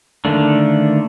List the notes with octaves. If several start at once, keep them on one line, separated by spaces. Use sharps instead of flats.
D3 D#3 A3 A#3 D4